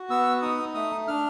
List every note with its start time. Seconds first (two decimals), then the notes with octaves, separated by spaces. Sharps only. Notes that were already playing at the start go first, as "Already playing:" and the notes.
Already playing: F#4
0.09 B3 E6
0.42 D#4 D#6
0.74 A3 D#6
1.08 D4 F6